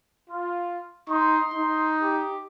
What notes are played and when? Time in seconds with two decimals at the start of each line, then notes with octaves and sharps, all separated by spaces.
0.29 F4
1.09 D#4 C6
1.54 D#4
2.01 G4